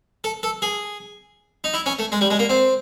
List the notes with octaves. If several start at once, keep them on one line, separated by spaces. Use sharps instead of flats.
A4
A4
G#4
D#4
E4
C#4
A3
G#3
G3
G#3
A#3
C4